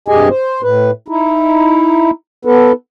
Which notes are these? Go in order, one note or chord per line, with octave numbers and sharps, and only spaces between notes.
G2 C3 G4 G#4 D#5 G#5
C5
A2 B4
D#4 E4
B3 A4 B4